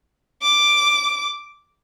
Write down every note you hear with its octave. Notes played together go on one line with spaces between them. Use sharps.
D6